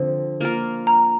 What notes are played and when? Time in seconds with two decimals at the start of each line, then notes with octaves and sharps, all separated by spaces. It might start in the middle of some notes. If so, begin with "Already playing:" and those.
Already playing: D3 F3 C4
0.41 A#3 F4 A#4
0.87 A#5